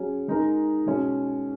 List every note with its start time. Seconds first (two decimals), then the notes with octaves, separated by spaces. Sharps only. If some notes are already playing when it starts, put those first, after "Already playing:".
Already playing: F#3 C#4 G#4
0.28 G#3 D#4 A#4
0.86 B2 G#3 C#4